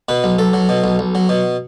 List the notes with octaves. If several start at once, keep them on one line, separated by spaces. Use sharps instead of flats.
B2 B4
B1
B1 A4
F#3
B2
B1
B1
F#3
B2